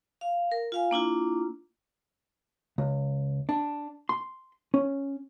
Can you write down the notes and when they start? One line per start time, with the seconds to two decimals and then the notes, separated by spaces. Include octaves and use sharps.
0.21 F5
0.52 A#4
0.72 F4 F5 G#5
0.91 A#3 D4 E4 F4
2.78 C#2
3.49 D4
4.09 C6
4.74 C#4